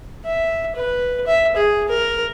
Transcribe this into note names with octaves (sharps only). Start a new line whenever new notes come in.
E5
B4
E5
G#4
A#4